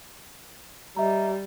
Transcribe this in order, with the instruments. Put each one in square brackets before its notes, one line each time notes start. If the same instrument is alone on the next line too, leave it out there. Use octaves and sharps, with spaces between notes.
[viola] G3 [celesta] D#5 E5 A#5